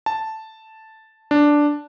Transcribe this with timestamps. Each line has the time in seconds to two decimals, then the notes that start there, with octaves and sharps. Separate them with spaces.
0.06 A5
1.31 D4